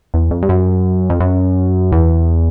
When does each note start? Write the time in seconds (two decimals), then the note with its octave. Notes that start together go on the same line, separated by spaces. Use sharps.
0.14 E2
0.31 F2
0.43 G2
0.49 F#2
1.10 F2
1.20 F#2
1.92 E2